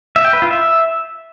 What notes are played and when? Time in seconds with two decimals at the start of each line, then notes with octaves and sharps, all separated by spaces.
0.16 E5
0.25 G5
0.33 B4
0.42 F4
0.51 E5